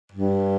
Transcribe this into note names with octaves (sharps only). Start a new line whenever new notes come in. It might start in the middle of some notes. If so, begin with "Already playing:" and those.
G2